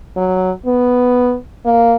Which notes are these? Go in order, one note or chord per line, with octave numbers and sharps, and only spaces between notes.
F#3
B3
A#3